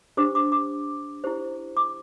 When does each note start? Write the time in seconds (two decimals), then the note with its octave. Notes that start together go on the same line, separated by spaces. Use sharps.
0.17 D4 G4 C5 D6
0.35 D6
0.52 D6
1.24 E4 G4 C5
1.77 D6